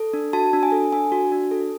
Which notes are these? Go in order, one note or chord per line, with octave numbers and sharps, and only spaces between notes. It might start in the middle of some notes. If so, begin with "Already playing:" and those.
Already playing: A4
D4
F#4 A5
D4
G#5
A4
D4 G#5
F#4
D4
A4